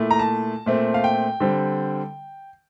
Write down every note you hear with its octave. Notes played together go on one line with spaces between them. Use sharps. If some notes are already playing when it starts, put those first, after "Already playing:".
Already playing: A#2 A3 E4
A#5
A5
A#2 A3 C4
F5
G5
D3 G3 C4